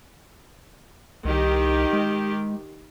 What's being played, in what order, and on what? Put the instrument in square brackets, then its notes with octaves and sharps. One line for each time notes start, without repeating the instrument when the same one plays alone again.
[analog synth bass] C2 [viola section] D#3 G4
[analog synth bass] G#3